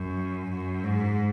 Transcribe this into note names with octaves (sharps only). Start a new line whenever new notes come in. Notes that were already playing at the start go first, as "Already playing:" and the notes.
Already playing: F#2
F#2
G#2